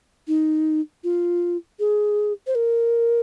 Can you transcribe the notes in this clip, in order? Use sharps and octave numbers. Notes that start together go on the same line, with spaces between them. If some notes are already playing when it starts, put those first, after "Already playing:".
D#4
F4
G#4
C5
A#4